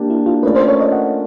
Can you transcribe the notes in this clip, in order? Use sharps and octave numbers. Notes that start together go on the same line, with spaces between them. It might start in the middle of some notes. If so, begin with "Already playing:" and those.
Already playing: A#3 D4 G4
E4
F4
A3 C#4 F4 A#4 B4 D5
C5
C#5
D#5
F#5